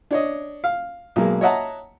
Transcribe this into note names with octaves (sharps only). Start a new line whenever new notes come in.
D4 C#5 D#5
F5
B1 G#3 A#3
C#5 D#5 E5 F#5 A5 A#5